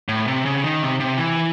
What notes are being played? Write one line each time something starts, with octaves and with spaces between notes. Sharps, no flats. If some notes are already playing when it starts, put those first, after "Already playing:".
A2
C3
C#3
D#3
C3
C3
E3